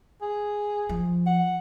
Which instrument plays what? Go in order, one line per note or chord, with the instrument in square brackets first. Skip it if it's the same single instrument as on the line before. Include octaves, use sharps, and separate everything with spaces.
[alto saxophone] G#4
[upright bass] F3
[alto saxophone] F#5